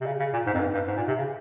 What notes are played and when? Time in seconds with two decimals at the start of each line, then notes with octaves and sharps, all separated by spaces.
0.01 C3
0.06 C#3
0.19 C#3
0.33 A#2
0.47 G#2
0.54 F2
0.60 G2
0.74 G2
0.88 G#2
0.97 A#2
1.08 C3
1.18 C#3